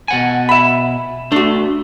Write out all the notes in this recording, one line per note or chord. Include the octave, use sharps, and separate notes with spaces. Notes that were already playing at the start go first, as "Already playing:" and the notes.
B2 F#5 G#5
E5 B5
A3 D4 F#4